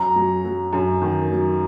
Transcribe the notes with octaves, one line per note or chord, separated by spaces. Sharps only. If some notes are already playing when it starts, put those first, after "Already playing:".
Already playing: F#2 A#5
F#3
F#3
F#2
D#3
F#3